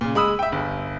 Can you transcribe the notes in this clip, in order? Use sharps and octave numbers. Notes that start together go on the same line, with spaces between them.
A#2 C#3
G#3 B5 D#6 E6
E5 G5
G1